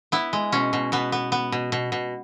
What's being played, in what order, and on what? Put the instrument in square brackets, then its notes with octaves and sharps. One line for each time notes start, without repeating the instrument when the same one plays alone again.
[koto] B3 E4
G#3
B2 C#4
B2
B2 B3
B3
B3
B2
B2
B2